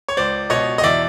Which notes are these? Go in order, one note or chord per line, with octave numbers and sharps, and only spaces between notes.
C#5
C#2 C5 D5
B2 C#5 D#5
D#5
E2 D5 E5